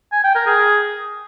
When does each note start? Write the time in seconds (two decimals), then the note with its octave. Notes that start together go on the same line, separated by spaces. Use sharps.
0.12 G#5
0.24 G5
0.35 A#4
0.46 G#4